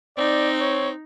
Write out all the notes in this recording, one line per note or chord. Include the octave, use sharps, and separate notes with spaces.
C4 D#4 D5
C#5